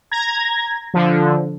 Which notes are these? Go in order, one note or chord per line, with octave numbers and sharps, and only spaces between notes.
A#5 G#6 A#6
D3 F3